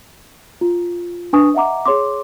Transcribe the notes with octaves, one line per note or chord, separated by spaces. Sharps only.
F4
D4 B4 G#5 C#6 D#6
D#5 E5 F#5 A#5 D6
G#4 C#5 C6 D6